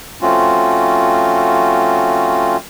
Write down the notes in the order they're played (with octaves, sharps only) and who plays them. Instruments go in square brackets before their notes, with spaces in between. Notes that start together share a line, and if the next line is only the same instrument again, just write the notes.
[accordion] F3 A3 C4 C#4 F4 F#4